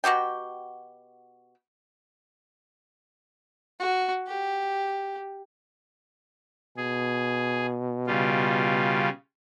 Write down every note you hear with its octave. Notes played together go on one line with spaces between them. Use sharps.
B2 F#4 G4 G5
F#4
G4
B2 G#4
C#3 G3 F4